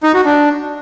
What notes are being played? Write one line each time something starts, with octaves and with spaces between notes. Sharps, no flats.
D#4
F#4
D4